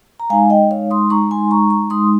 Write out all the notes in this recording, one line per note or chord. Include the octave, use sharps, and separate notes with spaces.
A#5
G#3 D#4 F5 G#5
D#5 G5
C#5 F5
C6 D#6
G#3 D#4 A#5 C#6
G#5 C6
A#5 C#6
A#5 C#6
G#3 D#4 C6 D#6